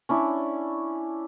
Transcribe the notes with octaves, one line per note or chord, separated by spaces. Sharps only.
C#4 D4 E4